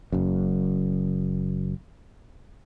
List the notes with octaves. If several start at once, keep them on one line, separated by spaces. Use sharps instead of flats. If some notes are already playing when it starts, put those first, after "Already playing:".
F#1 F#2